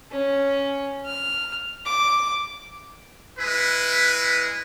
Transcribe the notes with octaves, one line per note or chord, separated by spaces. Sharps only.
C#4
F6
D6
G#3 E4 B4